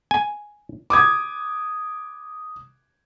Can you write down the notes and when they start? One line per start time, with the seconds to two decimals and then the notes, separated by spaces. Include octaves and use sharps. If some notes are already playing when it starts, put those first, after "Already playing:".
0.11 G#5
0.90 D6 D#6 G#6